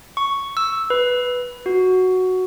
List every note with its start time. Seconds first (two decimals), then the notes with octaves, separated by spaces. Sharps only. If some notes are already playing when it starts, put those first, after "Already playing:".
0.17 C#6
0.57 E6
0.90 B4
1.66 F#4